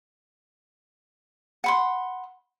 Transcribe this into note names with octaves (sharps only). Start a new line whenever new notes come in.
F#5 B5 C6